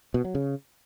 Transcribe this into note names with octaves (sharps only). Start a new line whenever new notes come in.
B2
F#3
C#3